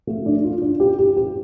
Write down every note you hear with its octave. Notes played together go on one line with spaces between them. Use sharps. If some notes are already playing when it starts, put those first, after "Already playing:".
A3
D4
F4
D4
G4
G4
G4